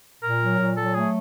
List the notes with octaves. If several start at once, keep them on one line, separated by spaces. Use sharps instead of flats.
A#2 A#4
F#3
A#2
F#3 A4
A3 G#4